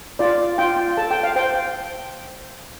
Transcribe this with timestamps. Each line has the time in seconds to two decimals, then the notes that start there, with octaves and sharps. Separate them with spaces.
0.19 F4 D5
0.58 F4 G5
0.97 A4 A5
1.11 G5
1.23 F5
1.36 C5 G5